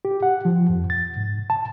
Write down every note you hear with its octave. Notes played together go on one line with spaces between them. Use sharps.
G4
F#5
F3
F2
A6
G#2
A5